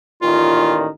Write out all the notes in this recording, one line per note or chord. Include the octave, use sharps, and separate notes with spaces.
A1 A#2 D#3 F4